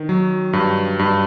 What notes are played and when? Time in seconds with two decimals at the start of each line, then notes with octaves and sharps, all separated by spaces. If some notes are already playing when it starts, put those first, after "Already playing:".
Already playing: D#3
0.09 F#3
0.53 G2
0.99 G2